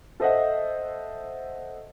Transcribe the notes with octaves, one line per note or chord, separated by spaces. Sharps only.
A4 C5 D#5 E5 F#5